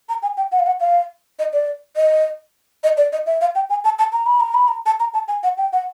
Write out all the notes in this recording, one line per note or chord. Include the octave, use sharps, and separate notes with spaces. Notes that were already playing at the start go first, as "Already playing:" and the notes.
A#5
G#5
G5
F#5
F5
F#5
F5
D#5
D5
D#5
D#5
D5
D#5
E5
F5
G5
G#5
A5
A5
A#5
B5
A#5
B5
A#5
A5
A#5
A5
G#5
F#5
G5
F#5